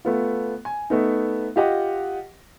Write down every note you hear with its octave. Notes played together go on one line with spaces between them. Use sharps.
A3 B3 F4
G#5
A3 B3 D#4
F4 G4 D#5 F#5